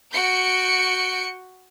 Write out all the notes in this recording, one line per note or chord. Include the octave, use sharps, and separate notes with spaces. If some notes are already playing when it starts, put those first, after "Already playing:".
F#4 G6 C#7 D7